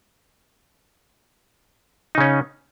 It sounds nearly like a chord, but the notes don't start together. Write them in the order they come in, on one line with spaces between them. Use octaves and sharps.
D#4 C#3 C#4